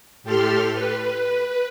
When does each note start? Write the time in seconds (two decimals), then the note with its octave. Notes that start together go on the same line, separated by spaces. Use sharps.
0.23 A2 G4 A4 C6 F6
0.74 B4